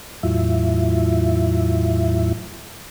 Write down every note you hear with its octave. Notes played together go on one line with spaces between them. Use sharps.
E2 A2 F#3 E4 F4 E5